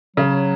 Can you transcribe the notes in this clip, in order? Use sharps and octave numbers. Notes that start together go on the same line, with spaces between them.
C#3 F#3